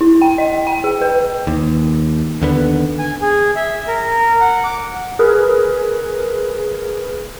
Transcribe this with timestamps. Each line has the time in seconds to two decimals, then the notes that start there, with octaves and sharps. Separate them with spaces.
0.01 E4
0.21 G5
0.38 D#5
0.67 G5
0.84 G#4
1.02 B4
1.47 D#2
2.41 D#2 D3 B3
2.99 G#5
3.22 G#4
3.56 E5
3.87 A#4
4.41 F#5
4.64 D6
5.19 G#4 A#4 B4